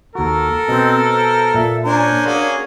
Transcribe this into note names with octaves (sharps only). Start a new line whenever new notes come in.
D#2 F#4 A4 A#4
B2 C4 D#5
C5
A#2 E5
C#4 D4 A#4 C5
A#3 C#4 F#4 G#4 A#4